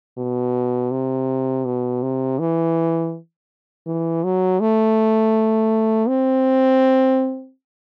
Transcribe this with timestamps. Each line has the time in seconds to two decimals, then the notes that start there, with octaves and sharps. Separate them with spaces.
0.18 B2
0.91 C3
1.65 B2
2.02 C3
2.39 E3
3.87 E3
4.24 F#3
4.61 A3
6.08 C4